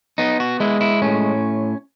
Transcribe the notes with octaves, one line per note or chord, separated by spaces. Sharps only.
B3 D#4
F#4
G#3 E4
E4
A2 C#4